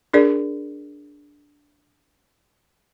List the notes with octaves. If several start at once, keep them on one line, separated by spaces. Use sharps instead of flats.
D4 G#4 A#4 D5